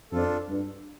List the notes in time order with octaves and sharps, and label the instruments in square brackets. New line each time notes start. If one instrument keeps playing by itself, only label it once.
[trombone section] F2 [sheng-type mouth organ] D4 F4 A4
[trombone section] G2